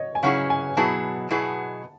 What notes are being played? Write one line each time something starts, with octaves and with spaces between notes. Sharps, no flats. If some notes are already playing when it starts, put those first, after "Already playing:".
Already playing: C#5 D#5
G#5
C#3 F#3 C#4 E4 G#4 F#5
G#5
B2 F#3 B3 E4 G#4 A5
B2 F#3 B3 E4 G#4